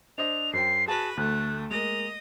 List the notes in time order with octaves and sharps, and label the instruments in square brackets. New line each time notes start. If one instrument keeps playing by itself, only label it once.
[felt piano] D4 C5 D#5 [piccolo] F7
[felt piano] F#2 C5 G5 [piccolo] C7
[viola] F#4 B4 [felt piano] G#4 [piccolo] A5
[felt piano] D2 [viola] A3 [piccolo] F#6
[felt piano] G#3 A#3 [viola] D#5 [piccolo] F7